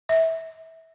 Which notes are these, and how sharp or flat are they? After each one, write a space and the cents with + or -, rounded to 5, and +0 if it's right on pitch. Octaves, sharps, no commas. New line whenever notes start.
E5 -20